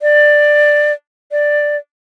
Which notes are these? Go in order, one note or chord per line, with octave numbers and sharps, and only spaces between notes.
D5
D5